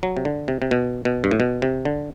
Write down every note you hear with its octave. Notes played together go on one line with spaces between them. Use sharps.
F#3
C3
D3
C3
C3
B2
B2
G2
A2
B2
C3
D3